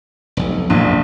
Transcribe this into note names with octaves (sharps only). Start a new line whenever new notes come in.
F1 B1
A#1